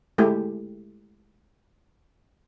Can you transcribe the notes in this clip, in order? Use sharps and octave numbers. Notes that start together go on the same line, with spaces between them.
G#3 A3 E4 G4